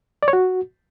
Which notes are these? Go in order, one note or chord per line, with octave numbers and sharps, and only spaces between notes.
D5
C#5
F#4